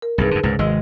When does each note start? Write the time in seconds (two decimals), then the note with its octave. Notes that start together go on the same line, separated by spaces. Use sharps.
0.02 A#4
0.18 C2 G2 D#4 G#4 B4
0.31 F#2 D3
0.43 C#2 G#2 C3
0.59 G#1 G#3 D#5 E6